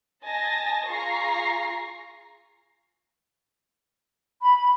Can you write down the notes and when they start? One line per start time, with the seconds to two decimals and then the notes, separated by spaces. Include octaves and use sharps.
0.24 D#5 G#5 A5 A6 A#6
0.87 F4 G#4 A#5 C#6 A#6 C7
4.43 B5